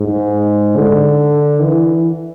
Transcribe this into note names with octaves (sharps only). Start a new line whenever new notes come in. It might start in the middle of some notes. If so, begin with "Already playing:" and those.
Already playing: G#2
D3
E3